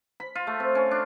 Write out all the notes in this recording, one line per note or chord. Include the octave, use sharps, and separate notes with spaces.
B5
F4
A3
C4
C#4
D4